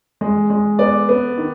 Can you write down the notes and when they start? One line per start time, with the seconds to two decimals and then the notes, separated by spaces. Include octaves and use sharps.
0.21 G#3
0.50 G#3
0.79 B3 D5
1.09 B3
1.38 D#3